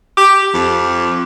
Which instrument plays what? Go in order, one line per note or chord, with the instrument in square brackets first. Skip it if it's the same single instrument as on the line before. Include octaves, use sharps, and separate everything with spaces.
[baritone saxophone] G4 [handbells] D6
[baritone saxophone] F2